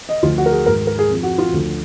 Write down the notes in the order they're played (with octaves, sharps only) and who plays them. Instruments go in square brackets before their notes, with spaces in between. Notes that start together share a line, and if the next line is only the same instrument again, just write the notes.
[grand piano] D#5
D2 D3 F3 F4
F#4
A#4
G#4
G#2 D#3 A#4
A#4
G#4
F2 F3
F#4
F4
D2 D3 F3